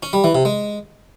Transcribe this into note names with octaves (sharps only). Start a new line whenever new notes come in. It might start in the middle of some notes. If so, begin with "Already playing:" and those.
C#4
G3
E3
C3
G#3